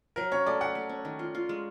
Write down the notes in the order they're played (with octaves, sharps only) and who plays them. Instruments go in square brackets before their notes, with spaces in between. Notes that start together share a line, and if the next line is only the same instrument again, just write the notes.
[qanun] F#3 [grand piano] A#4
[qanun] C#4 [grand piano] C#5
[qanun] A3 [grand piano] D5
[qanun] A3 [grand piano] F#5
[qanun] A3
C#4
D#3
F4
F4
G#3